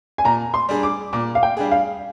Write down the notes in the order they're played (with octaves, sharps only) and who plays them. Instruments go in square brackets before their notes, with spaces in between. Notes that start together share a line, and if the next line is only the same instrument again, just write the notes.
[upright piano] G#5
[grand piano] A#2 [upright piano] A#5
[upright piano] C6
[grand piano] G3 D4 G#4
[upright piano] D6
[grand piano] A#2 [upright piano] D6
[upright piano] F5
G5
[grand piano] G3 D4 G#4
[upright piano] F5